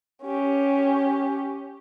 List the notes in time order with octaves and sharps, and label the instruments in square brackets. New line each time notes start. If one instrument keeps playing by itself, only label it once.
[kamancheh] C#4 G4